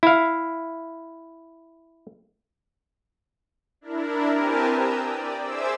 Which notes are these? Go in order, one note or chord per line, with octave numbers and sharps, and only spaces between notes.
E4 F5
D4 E4 A#4
C4 G4 A#4 B4 G#5 A5
A#5 D#6 E6 G6
D5
G#4 C5 E5 D6 E6